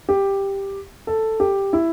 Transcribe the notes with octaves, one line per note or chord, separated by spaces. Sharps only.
G4
A4
G4
E4